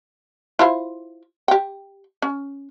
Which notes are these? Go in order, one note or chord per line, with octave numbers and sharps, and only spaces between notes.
E4 F4 C5
G4 G5
C#4